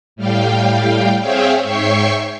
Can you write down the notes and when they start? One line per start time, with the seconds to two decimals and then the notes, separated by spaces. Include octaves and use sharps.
0.16 A2 G3 F5 G5
1.21 C4 G#4 C#5 E5 F5 G5
1.63 G#2 C#5 E5 G5 C#6 C7